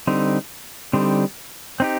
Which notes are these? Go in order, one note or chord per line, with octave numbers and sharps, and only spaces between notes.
D3 G3 C4 D#4
D3 G3 C4 D#4
C4 D#4 G4